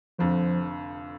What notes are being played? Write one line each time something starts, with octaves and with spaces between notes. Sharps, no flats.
F1 F2 D3 F3